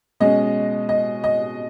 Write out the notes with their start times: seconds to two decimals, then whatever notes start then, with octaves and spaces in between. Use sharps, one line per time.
0.20 B2 G#3 C#4 D#5
0.89 D#5
1.24 D#5